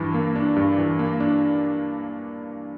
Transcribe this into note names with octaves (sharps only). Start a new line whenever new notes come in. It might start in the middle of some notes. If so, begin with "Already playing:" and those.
Already playing: G2 E3 D4
A#3
D4
G2
E3
A#3
D4